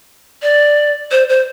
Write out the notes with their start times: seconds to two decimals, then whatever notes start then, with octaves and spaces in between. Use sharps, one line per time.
0.42 D5
1.11 C5
1.29 C5